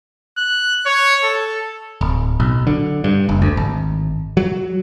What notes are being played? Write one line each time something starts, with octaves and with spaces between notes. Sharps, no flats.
F#6
C#5
A4
D1
B1
D3
G2
F#1
D2
G#1
F#3